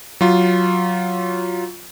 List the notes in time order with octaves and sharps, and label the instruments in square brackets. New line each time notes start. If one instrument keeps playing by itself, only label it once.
[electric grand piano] F#3 F4